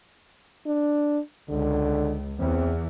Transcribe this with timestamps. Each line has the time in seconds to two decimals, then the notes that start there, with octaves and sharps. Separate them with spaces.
0.66 D4
1.49 C#2 D3
2.39 E2 C4